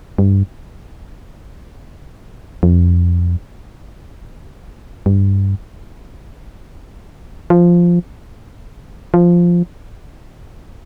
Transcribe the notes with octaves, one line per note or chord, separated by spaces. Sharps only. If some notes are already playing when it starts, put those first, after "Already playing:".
G2
F2
G2
F3
F3